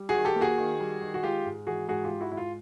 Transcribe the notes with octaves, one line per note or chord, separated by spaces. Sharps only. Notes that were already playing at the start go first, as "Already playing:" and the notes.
Already playing: G3
F#4 G#4
D#3
G4 A4
A#3
F#4 G#4
D#3
G3
D#3
F#4
G#3 F4 G4
G#2
E3 F#4 G#4
G#2 F#4 G#4
F4 G4
G#3
E4 F#4
G#2 E4
F4